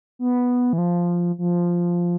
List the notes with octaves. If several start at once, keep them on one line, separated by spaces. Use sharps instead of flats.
B3
E3
F3
F3